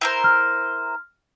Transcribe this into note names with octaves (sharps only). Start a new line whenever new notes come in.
E4 A#4 C5
F6